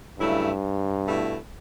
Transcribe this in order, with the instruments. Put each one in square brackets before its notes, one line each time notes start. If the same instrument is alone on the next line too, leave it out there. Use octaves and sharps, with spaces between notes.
[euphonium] G2 [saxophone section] C#3 F#3 A3 E4
[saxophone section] B2 A3 E4